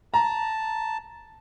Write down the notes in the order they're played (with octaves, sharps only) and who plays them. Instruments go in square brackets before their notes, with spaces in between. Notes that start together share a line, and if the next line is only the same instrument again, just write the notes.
[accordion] A5 [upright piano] A#5